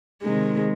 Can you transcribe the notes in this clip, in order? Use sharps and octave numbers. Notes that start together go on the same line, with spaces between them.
C3 D#3 G#3